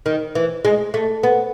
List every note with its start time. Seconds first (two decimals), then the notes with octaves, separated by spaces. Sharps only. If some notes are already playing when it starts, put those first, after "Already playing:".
0.06 D#3
0.35 E3
0.65 G#3
0.94 A3
1.23 B3